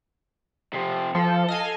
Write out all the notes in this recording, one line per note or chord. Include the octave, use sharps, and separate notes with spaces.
C3 F3
F3 A4
D#5 F5 G#5